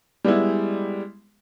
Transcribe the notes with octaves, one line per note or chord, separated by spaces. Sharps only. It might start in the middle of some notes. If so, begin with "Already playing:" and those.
G3 G#3 B3 E4